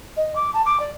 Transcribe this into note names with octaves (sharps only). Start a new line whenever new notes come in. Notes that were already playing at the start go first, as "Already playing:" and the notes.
D#5
D6
A5
D6
D5